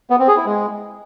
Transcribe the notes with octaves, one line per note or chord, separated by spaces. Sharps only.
B3
C4
G#4
E4
G#3